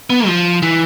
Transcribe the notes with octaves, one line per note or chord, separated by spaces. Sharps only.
B3
F3
E3